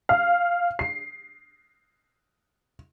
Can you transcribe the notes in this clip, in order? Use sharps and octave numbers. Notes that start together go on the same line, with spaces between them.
F5
C7